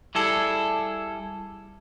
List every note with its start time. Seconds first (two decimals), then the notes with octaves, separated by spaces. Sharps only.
0.15 G3 E4 G#4 A4